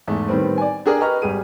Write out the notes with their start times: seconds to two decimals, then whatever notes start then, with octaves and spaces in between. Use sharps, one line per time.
0.08 E2 G#2 A3
0.29 A2 D#3 G3 B3 C4
0.58 D5 G#5
0.86 D4 G4 G#4 A#4 D5
1.01 G4 B4 D#5 A#5 C#6 F6
1.22 G#1 G3 G4 G#4 D#7